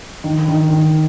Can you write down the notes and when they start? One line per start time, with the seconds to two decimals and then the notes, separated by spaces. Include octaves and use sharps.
0.24 D#3
0.48 D#3
0.71 D#3